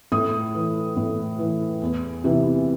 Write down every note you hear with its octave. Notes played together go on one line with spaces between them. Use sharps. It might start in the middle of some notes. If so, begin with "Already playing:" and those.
A2 D#6
E3
A2
E3
E2
C3 E3